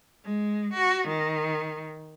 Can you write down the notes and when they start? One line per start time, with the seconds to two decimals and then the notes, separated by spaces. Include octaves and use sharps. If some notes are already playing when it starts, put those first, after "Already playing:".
0.24 G#3
0.74 F#4
1.08 D#3